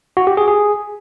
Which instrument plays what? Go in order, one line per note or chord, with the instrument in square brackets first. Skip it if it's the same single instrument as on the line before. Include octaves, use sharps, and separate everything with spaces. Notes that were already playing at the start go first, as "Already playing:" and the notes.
[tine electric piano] F#4
G4
G#4
G#4